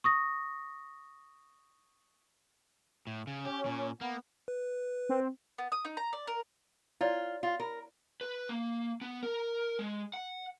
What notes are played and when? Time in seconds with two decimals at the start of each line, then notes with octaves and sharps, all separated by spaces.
0.04 C#6 D#6 A#6
3.07 A2
3.27 C#3
3.45 C#4 G4
3.66 A#2
4.01 A#3 B3
4.48 B4
5.09 C4
5.58 B3
5.72 D#6
5.85 D#4
5.97 A#5
6.13 D5
6.27 A#4
7.01 E4 F4 C#5 D5
7.43 F4
7.60 A#4
8.21 B4
8.49 A#3
9.01 B3
9.23 A#4
9.79 G#3
10.14 F#5